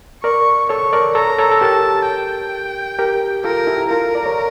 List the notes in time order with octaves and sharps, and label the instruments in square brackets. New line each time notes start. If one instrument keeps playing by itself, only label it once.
[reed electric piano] A#4 D5 [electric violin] C#6
[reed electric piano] A4 C#5 [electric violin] C#6
[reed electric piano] A#4 D5
[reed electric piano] A4 C#5 [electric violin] A#5
[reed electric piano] A#4
A4 C#5
A4
[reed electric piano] G4 A#4 [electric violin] A5
[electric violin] G5
[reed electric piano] G4 A#4
[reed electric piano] F4 A4 [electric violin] A#4
[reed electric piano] E4 G4
[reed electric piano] F4 A4 [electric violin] A#4
[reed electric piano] D5
C#5